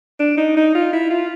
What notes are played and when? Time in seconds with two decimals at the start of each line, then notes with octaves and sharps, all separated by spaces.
0.20 D4
0.37 D#4
0.57 D#4
0.75 F4
0.93 E4
1.10 F4